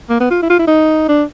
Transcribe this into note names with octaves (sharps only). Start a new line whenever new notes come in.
A#3
B3
F4
E4
F4
E4
D#4
D4